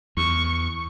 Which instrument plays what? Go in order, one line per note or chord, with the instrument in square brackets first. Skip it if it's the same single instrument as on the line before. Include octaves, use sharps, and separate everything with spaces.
[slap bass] E2 [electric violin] C#6